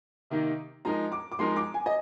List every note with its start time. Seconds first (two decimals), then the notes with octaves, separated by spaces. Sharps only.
0.30 C3 D#3 A#3 D#4
0.85 F3 G#3 D#4 A#4 A#5
1.12 D6
1.31 D6
1.39 F3 G#3 D#4 A#4 C6
1.56 D6
1.74 G#5
1.86 D#5